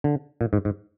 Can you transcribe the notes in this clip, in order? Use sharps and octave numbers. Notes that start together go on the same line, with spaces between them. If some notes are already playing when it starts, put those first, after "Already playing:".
D3
A#2
G#2
G#2